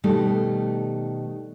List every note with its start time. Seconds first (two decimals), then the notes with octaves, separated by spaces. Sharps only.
0.04 B2 D#3 G3 A3